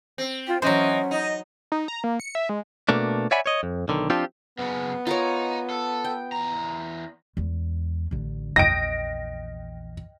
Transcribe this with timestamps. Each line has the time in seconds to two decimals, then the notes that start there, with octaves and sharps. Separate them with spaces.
0.18 C4
0.47 F4 G5
0.62 E3 F#3 C#4 C5 D#5
1.11 D#4 D#5
1.72 D#4
1.88 A#5
2.04 A#3
2.20 C#7
2.35 E5
2.49 G#3
2.89 B2 A3 A#3 D4
3.31 C#5 D5 E5 F#5 G#5 B5
3.46 C#5 D#5
3.63 F2
3.88 B1 D3 D#3
4.10 F3 C4 D4 F4 G4
4.59 F#2 C#3 B3
5.07 D#4 F4 A#4 C#5
5.70 A4
6.04 G5
6.32 E2 A#5
7.37 E2 G#3
8.11 A1 D3
8.56 A#1 E2 D#5 G5 A#6 D7